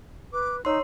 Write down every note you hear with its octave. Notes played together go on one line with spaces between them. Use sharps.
B4 D6
D#4 C#5 C6 E6